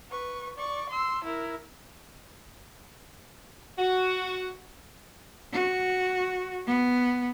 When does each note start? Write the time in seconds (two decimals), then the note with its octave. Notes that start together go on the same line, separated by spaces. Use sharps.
0.10 B4 C#6
0.57 D5 C#6
0.89 C6 E6
1.24 E4 A#4
3.78 F#4
5.52 F#4
6.66 B3